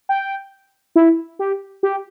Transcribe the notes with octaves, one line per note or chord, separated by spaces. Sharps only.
G5
E4
G4
G4